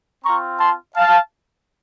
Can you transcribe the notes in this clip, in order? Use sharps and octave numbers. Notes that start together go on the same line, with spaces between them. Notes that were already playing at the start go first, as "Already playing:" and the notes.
C4 F4 A#5 C#6
A5 C6
F5 A5